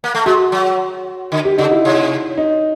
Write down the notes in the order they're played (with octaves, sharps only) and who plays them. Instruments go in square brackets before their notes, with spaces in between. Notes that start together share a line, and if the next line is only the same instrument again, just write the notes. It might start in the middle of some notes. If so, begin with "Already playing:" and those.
[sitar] A#3
A3
[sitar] G#3 [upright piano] F#4
[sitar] F#3
D3
[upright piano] G4
[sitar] C#3 [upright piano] D#4
[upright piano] E4
[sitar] C3
[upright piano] D#4